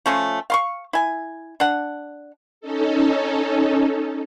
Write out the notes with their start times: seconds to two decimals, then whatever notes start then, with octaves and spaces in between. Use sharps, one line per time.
0.06 F3 A3 C#4 F4
0.50 F5 C6 C#6
0.93 E4 G#5
1.60 D4 F#5
2.61 C#4 D#4 A4